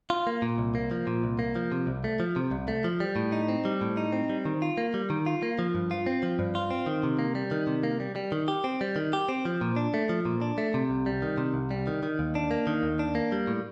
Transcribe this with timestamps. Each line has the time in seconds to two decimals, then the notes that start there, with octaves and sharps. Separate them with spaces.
0.10 F4
0.27 A#3
0.42 A#2
0.58 C2
0.75 A#3
0.91 F3
1.07 A#2
1.24 C2
1.39 A#3
1.56 F3
1.72 C3
1.87 C2
2.04 A3
2.20 F3
2.36 C3
2.51 C2
2.68 A3
2.84 F3
3.00 G3
3.16 A2
3.32 D#4
3.48 C4
3.65 G3
3.81 A2
3.97 D#4
4.12 C4
4.29 G3
4.45 D#3
4.62 F4
4.78 A#3
4.94 G3
5.10 D#3
5.26 F4
5.43 A#3
5.59 F3
5.75 G2
5.91 F4
6.06 C4
6.23 F3
6.39 G2
6.55 F4
6.70 C4
6.86 D#3
7.03 C3
7.19 A#3
7.35 G3
7.51 D#3
7.67 C3
7.83 A#3
8.00 G3
8.16 G3
8.32 D#3
8.48 G4
8.64 C4
8.81 G3
8.96 D#3
9.13 G4
9.29 C4
9.45 F3
9.61 A#2
9.76 D4
9.94 A3
10.09 F3
10.25 A#2
10.41 D4
10.58 A3
10.74 C3
10.90 C2
11.06 G3
11.22 D#3
11.38 C3
11.54 C2
11.71 G3
11.87 D#3
12.03 D#3
12.19 D#2
12.35 D4
12.51 A#3
12.67 D#3
12.83 D#2
12.99 D4
13.15 A#3
13.32 G3
13.47 A2